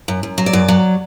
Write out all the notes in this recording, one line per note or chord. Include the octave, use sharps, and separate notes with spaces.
F#2
F#2
F#3
D5
F#2
F#3